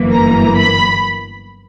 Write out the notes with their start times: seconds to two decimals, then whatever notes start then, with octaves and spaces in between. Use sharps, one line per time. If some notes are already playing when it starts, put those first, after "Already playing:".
Already playing: G1 F#2 E3 A#3
0.13 A#5
0.57 B5